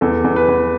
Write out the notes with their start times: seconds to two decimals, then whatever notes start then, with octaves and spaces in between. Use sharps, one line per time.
0.01 E2 A4
0.24 E2
0.36 B4
0.48 E2